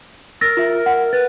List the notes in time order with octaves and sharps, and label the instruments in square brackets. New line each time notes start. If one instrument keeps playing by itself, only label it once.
[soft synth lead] A#4 [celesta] E6 A6 A#6
[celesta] F4 E5 [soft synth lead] A#4
[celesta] F#5
[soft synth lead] B4 [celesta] A6